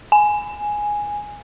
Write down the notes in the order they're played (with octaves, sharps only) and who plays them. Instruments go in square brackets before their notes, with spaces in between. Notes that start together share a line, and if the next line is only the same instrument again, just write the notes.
[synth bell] G#5